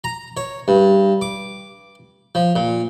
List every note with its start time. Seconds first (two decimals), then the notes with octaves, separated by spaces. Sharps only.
0.04 A#5
0.37 C#5
0.68 G2
1.21 D6
2.35 F3
2.56 A#2